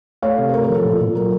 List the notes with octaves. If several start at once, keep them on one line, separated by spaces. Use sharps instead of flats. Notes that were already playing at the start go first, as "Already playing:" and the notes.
A3 C#5 F5
C3
C5
A3 A#4 C#5
A#4
F3
A4
A#2
A#2
F#3 A#4